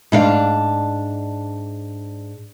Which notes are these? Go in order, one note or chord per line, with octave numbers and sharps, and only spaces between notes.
G#2 D4 F5